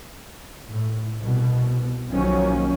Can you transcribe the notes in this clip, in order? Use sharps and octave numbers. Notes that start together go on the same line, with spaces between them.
A2
C2 B2
B1 D#3 F3 F#3 A#3 C#4